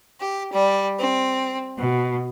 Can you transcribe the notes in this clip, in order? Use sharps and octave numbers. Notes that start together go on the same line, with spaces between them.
G4
G3
C4
B2